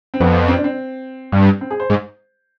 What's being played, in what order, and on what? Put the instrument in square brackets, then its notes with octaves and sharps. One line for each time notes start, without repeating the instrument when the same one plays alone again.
[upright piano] C4
[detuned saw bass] F2 [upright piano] B3
[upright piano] C4
D4
C4
[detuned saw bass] G2
[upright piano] C4
G#4
C5
[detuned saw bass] G#2